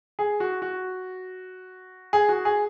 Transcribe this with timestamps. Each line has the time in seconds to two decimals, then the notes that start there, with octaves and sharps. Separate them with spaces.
0.19 G#4
0.40 F#4
0.62 F#4
2.13 G#4
2.29 F#4
2.45 G#4